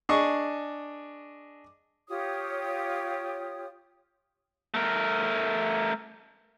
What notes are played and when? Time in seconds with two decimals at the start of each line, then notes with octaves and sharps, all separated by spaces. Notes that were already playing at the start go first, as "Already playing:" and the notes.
0.09 D4 G#4 D#5 C#6
2.08 F4 G4 C#5 D#6
4.74 A3 A#4